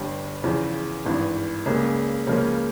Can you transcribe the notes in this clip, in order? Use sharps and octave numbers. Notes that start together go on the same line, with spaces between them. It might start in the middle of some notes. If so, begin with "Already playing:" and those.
Already playing: G1 G2 G3
E2 C#3 F3
G#1 G2 E3
C#2 C#3 G3 A#3
C#2 C#3 F3 A#3 C#4